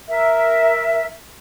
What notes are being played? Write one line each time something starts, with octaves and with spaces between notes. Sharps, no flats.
A#4 E5